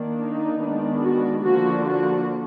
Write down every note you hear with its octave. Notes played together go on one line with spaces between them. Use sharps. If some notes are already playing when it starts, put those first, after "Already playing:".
Already playing: D#3 A#3 D4
D#4
D#3 G#3 B3 D4
F#4
D3 F3 A#3 D4 F#4
F#4